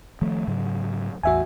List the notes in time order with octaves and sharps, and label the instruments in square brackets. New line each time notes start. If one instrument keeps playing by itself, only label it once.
[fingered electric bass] D#3 F3 A3
G#2 C#3 F#3
[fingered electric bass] A1 E2 [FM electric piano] F#4 E5 G#5